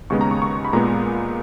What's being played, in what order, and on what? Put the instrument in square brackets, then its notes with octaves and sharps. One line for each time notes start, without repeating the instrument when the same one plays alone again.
[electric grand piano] D#2 C#3 G#3 B3 C#6
A#5
C#6
C#6
B5
A#2 G#3 B3 A#5